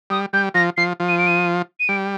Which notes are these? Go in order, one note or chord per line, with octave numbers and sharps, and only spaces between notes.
G3 D#6
G3 G6
F3 A#6
F3 C7
F3
D#7
D7
D#7
D#7
G3 D7